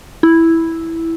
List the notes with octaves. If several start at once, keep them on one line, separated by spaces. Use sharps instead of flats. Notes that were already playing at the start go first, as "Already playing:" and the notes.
E4